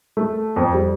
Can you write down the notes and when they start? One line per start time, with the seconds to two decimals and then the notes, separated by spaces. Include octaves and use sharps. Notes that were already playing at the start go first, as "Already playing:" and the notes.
0.17 A3
0.56 F2
0.74 G3